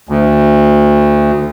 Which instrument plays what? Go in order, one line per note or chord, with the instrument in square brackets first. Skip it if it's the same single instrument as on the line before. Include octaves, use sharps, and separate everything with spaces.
[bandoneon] D2